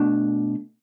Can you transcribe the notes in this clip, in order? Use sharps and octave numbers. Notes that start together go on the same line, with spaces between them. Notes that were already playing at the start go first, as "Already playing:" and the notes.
Already playing: B2 A3 D4